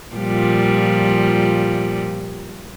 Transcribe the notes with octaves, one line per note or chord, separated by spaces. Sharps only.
A#2 F3 G3